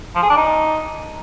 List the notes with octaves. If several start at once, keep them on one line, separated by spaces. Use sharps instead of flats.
F3
G#4
D4
D#4